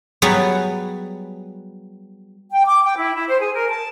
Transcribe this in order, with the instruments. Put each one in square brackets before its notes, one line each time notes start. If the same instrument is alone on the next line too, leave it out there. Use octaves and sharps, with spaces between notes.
[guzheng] F#3 G3 B3 F#4 G#4 B4
[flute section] G5
D6
G5
E4
E4
C5
G#4
A#4
A5